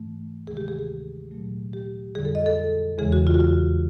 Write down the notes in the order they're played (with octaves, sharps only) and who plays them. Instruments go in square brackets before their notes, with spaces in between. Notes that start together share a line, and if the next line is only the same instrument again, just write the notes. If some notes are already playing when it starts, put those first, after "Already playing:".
Already playing: [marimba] G#2 E3 A3
D2 C3 D#3 G#3 G#4
G4
G#4
G#4
A#2 F#3 A3
G4
F2 D3 G3 G#4
A4
D#5
A4
E2 C#3 E3 G#3 G#4
F#4
F4
F#4
F4